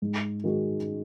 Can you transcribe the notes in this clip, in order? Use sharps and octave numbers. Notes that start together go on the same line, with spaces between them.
G#2
D#3 G#3 D#4 F#4